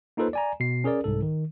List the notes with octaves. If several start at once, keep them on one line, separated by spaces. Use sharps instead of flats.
A#3 D#4 F4 A4 B4 C5
D5 G#5 A#5
B2 C7
C#4 G#4 A#4 D5
C2 G#2 A4
D#3